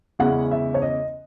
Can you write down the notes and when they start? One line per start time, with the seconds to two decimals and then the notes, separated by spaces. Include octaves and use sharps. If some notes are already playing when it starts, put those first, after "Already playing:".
0.19 E2 C#3 G#3 C#4 E4 F#5
0.51 E5
0.74 C#5
0.82 D#5